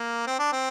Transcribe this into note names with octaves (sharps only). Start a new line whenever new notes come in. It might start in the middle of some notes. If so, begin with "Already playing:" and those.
Already playing: A#3
C4
D4
C4